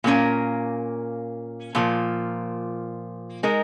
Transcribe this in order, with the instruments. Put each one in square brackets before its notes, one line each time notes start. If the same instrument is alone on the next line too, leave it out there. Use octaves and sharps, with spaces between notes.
[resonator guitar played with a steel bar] A#2 A#3 C#4 A#4
A#2 F3 A#3
G#3 D#4 A#4